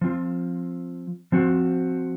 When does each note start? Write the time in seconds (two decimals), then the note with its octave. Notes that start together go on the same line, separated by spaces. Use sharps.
0.01 F3 C4 F4
1.32 F3 C4 F#4